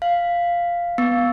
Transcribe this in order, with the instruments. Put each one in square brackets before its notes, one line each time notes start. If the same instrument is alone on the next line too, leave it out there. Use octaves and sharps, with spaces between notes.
[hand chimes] F5
B3